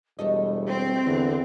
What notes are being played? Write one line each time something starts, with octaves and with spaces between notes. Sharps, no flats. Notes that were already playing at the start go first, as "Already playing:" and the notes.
E1 G3 A3 A4 D#5
C4
E2 D3